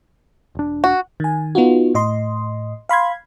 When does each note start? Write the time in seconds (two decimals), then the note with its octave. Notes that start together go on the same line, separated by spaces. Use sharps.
0.55 E1 D4
0.84 F#4
1.20 D#3 G#5
1.55 B3 D#4 F4 F#4
1.95 A2 D#5 C6
2.89 F5 B5 C6 G#6